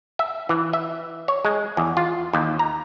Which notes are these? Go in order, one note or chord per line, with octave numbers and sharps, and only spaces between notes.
E5
E3
E5
C#5
G#3
E2
F4
D#2
A#5